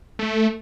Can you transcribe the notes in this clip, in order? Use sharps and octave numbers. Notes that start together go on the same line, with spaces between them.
A3